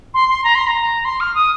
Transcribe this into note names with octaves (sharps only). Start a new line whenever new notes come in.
C6
C6
A#5
C6
A#5
C6
F6
D#6